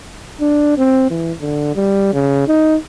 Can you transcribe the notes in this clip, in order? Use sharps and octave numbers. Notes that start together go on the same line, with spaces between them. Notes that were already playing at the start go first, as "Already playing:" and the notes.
D4
C4
E3
D3
G3
C#3
D#4